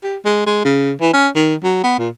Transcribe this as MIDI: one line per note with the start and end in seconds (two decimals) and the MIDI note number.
0.04 0.17 67
0.25 0.46 56
0.46 0.64 56
0.65 0.92 49
1.01 1.12 52
1.13 1.28 61
1.36 1.55 51
1.64 1.81 54
1.84 1.99 59
1.99 2.09 46